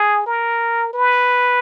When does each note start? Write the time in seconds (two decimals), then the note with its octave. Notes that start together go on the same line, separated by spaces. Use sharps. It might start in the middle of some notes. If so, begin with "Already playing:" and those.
Already playing: G#4
0.26 A#4
0.94 B4